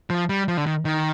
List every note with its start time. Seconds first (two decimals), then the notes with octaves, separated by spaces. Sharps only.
0.10 F3
0.29 G3
0.48 F3
0.57 D3
0.67 D#3
0.85 D#3